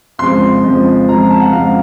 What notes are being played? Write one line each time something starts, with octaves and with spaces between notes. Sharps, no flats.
F2 C#3 F3 G#3 C6
F2 C#3 F3 G#3
F2 C#3 F3 G#3 A#5
A#5
A5
F#5
F2 C#3 F3 G#3 F5